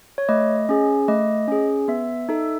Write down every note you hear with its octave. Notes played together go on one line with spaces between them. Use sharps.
C#5
A3 D#5
C#4 G#4
A3 D#5
C#4 G#4
B3 E5
D#4 A4